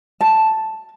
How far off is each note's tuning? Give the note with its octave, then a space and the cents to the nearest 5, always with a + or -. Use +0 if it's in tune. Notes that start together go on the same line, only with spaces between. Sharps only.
A5 +0